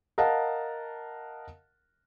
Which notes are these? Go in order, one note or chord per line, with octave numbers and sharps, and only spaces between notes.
A#4 D#5 F5 F#5 A5